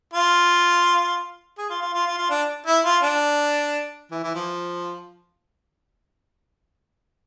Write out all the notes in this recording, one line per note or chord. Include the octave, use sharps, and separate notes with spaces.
F4
G#4
F4
F4
F4
F4
F4
D4
E4
F4
D4
E3
E3
F3